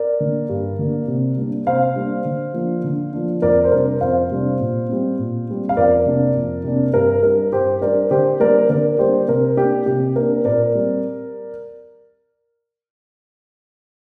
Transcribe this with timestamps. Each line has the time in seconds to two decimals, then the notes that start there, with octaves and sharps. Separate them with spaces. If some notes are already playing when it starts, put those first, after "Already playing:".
Already playing: A#4 D5
0.20 D3 A#3
0.49 G2
0.79 D3 A#3
1.08 C3
1.37 G3 A#3 D4
1.67 C3 C5 F5
1.96 G3 A#3 D4
2.25 D3
2.54 F3 A#3 D4
2.84 D3
3.13 F3 A#3 D4
3.42 F2 A#4 D5
3.64 C5
3.71 C3 G3 D4 A#4
4.01 F2 C5 F5
4.31 C3 G3 D4
4.60 A#2
4.89 G3 C4
5.19 A#2
5.47 G3 C4
5.69 F5
5.77 F2 A#4 D5
6.06 C3 A#3 D4
6.36 F2
6.64 C3 A#3 D4
6.94 G2 A#4
7.23 G3 D4 A#4
7.52 G2 G4 C5
7.81 G3 D4 A#4 D5
8.11 D3 G4 C5
8.40 G3 A#3 D4 A#4 D5
8.69 D3 A#4 D5
8.99 G3 A#3 D4 G4 C5
9.28 C3 A#4
9.57 A#3 D4 G4
9.86 C3 G4
10.16 A#3 D4 A#4
10.45 A#2 A#4 D5
10.75 G3 C4